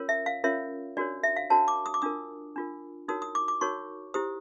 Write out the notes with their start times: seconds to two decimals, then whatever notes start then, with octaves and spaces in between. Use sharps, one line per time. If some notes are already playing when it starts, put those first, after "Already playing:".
Already playing: C#4 F4 A#4 C#5
0.09 E5
0.26 F5
0.44 C#4 F4 A#4 C#5 E5
0.97 D4 F#4 A#4 C#5 D5
1.23 E5
1.36 F5
1.50 D4 F#4 A#4 C#5 A5
1.68 D6
1.86 D#6
1.94 D6
2.02 D4 F4 A#4 D#6
2.56 D4 F4 A#4
3.08 D#4 F#4 A#4 C#5 D#6
3.22 D#6
3.35 D6
3.48 D6
3.61 D#4 F#4 A#4 C#5 C#6
4.14 E4 G4 C5 D#6